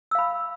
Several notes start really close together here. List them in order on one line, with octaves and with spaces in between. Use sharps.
E6 F5 B5